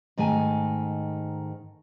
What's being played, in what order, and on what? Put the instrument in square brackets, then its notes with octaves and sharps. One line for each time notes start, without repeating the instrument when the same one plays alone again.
[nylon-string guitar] G#2 D#3 A3 G#5